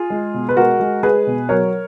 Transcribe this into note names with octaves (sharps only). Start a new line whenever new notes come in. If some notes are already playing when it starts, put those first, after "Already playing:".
Already playing: F4 G#4
G#3
B2
B4
G#3 F#4 A#4
G#3
G#3 G#4 B4
B2
F#3 A#4 C#5